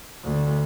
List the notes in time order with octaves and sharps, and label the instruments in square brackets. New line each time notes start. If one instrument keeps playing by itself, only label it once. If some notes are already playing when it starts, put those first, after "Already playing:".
[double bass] D2